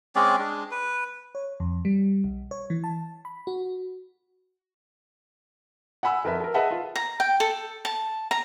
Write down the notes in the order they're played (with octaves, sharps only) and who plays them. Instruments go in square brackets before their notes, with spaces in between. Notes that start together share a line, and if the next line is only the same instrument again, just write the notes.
[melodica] G#3 C4 C#4 D5
G#3 D4
B4
[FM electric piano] C#5
F2
G3
B1
C#5
E3
A5
B5
F#4
[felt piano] F#5 G#5 B5 E6
F2 A#4 B4 E5 A5
A4 A#4
G#4 B4 D#5 E5 F#5 A5
F4
[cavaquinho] A#5
G5
A4
A5
A#5